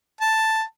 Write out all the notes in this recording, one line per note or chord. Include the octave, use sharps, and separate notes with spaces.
A5